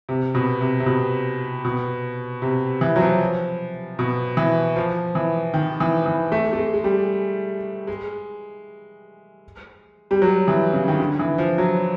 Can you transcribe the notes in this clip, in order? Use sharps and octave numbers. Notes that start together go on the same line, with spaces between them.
C3
B2
C3
C3
B2
B2
C3
E3
F#3
F3
B2
E3
F3
E3
D#3
E3
E3
A3
A3
G#3
G#3
G3
G#3
G3
F#3
E3
C#3
D#3
D3
E3
F3
F#3